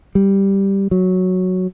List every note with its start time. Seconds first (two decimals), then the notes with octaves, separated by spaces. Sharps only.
0.15 G3
0.91 F#3